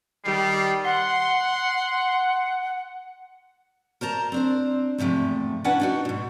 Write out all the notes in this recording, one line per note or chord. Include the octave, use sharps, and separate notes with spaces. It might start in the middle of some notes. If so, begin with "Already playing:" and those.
D#3 G3 C7
F#5 C6
A#4 C5 A5 A#5
C4 D4 C5
E2 G#2 C3 F3 A3
C#4 D4 E4 B4 F#5 G#5
D4 D#4 F#4
G#2 B2